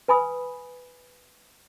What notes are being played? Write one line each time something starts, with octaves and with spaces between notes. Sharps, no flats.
B4 G#5 B5 D#6